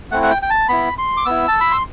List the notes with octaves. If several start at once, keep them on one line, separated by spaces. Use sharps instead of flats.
A3 C4 E4 F#5
F#5
G5
G5
A5
B3 E4 B5
C6
D6
B3 E4 E6
A5
B5
C6